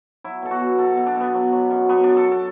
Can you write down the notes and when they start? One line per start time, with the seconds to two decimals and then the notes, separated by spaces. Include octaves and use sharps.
0.24 F#3 E4
0.42 B2 A4
0.51 F#4
0.61 B2
0.79 B2 A4
0.97 B2
1.06 D4
1.16 B2 B3
1.34 F#3
1.53 F#3
1.71 F#2
1.89 F#3 B3
2.04 F#2 D4
2.17 A4
2.32 A4